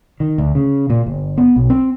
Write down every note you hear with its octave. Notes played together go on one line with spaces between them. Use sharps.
D#3
D2
C#3
A#2
G1
B3
B1
C4